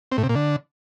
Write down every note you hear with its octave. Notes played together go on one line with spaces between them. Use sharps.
C4
A2
C3
A#2
D3